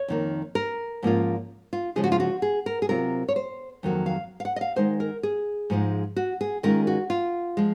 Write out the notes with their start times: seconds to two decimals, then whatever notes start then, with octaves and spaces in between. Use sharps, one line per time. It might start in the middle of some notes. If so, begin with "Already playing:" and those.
Already playing: C#5
0.08 F2 D#3 A#3
0.55 A#4
1.03 G#2 F3 A#3 C#4 F4
1.73 F4
1.96 C#3 F3 G#3 G#4
2.04 F#4
2.12 F4
2.20 F#4
2.42 G#4
2.66 A#4
2.82 G#4
2.89 C3 F#3 C4 F4 A#4
3.28 C#5
3.36 C5
3.83 F2 D#3 F#3 A#3
4.06 F5
4.40 F5
4.45 F#5
4.56 D#5
4.61 F5
4.76 D#3 G#3 D#4 C5
5.00 A#4
5.23 G#4
5.70 G#2 F3 G#3 D#4
6.16 F#4
6.41 G#4
6.63 D#3 G#3 C#4 F4 A#4
6.87 F#4
7.10 F4
7.57 F3 G#3